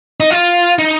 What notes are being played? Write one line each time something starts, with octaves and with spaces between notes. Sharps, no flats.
D#4
F4
D#4